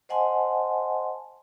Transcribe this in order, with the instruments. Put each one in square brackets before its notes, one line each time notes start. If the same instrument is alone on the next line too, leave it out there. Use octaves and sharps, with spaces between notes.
[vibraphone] C5 D#5 F#5 G#5 A5 C6